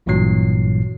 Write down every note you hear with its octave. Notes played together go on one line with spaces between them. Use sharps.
A1 G2 A#2 E3 F#3 C7